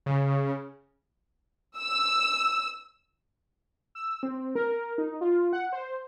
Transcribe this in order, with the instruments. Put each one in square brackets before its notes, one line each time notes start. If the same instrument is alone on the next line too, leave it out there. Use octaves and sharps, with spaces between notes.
[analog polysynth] C#3
[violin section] E6
[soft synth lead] E6
C4
A#4
D#4
F4
F#5
C5